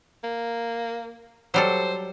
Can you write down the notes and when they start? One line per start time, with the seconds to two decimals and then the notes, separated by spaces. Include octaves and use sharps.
0.24 A#3
1.54 F#3 G3 A4 C5